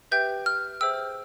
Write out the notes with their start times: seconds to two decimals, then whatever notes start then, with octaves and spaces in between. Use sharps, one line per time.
0.12 G4 B4 E5 G5 G6
0.46 F6
0.81 G#4 C5 E5 G5 E6